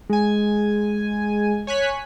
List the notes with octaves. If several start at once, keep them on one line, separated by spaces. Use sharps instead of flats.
G#3 G#5
C#5 G#5 F#6 B6